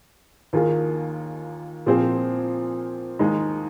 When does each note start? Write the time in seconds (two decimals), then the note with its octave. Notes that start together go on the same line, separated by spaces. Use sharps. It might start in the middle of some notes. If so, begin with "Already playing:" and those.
0.53 D#2 D#3 A#3 F4 G#4
1.86 A#2 F3 C4 G#4 C5
3.19 D#2 D#3 G#3 D#4